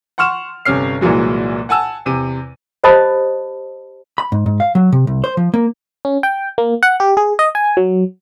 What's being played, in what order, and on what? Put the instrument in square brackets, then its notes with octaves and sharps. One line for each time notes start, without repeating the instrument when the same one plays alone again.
[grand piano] F#5 C6 C#6 F6 E7
G1 C3 C#4 F6 C7
C2 A#2 E3 F#3 G#3
F#5 G#5 A5 E6
E2 C3 D#7
[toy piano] G4 C5 D#5 A5 B5 D#6
[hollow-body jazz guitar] B5
G#2
G#2
F5
F#3
C3
C2
C5
F3
A#3
[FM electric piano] C#4
G5
A#3
F#5
G4
G#4
D#5
G#5
F#3